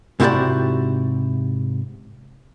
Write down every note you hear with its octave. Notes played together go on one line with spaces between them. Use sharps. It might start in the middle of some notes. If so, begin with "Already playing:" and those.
G#2 C3 E4 F#4 G4 D5